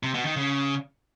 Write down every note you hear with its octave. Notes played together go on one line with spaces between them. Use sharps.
C3
B2
D#3
C#3